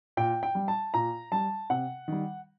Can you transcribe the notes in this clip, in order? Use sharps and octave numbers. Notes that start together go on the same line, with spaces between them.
A#2 G5
G5
G3
A5
A#2 A#5
G3 A5
C3 F#5
D#3 G3